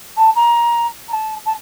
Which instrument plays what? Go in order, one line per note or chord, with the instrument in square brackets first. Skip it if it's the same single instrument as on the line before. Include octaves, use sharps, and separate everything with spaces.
[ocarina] A5
A#5
A#5
A5
A5